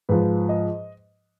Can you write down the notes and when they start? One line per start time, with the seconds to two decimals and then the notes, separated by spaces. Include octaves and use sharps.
0.09 G#2 F3 B4
0.49 D#5